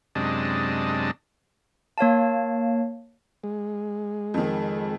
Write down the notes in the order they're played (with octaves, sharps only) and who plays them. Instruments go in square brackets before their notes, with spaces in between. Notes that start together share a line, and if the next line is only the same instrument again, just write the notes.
[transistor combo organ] F#2 C3 G#3 D4 D#5 A5
[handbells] A#3 C#5 F5 A5
[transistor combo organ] G#3
[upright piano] F2 D#3